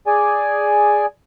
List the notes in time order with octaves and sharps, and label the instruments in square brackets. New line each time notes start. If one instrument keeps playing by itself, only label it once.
[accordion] G#4 D5 G#5